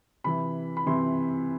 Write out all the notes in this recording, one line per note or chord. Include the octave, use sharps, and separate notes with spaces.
C3 E3 B5
B5
C3 E3 C6